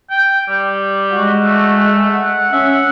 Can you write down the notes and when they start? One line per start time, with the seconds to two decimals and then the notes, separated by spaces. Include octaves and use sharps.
0.10 G5
0.49 G3
1.12 G#3 F#4
1.44 A3
2.14 F#5
2.53 C#4 E5